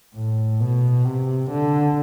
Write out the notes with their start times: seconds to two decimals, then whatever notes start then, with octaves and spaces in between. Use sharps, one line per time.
0.15 A2
0.60 B2
1.05 C3
1.51 D3